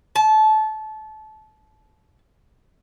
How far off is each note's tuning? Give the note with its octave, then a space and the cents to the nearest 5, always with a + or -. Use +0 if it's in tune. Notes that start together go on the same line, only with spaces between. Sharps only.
A5 -25